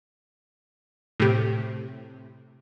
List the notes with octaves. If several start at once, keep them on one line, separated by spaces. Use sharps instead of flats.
A2 C3